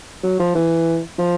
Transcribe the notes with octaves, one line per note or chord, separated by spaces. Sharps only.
F#3
F3
E3
F3